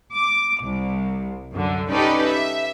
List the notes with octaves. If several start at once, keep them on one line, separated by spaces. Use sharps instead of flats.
D6
C2
F#2 D3
C#4 D#4 G4 A4 B4 D5
E5